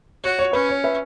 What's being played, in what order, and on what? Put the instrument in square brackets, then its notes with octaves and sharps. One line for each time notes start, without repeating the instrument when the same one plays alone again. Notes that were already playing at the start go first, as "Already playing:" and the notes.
[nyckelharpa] F#4 [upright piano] C#5
[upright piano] C#5
[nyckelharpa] C#4 [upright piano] B4
[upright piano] C#5
B4 E5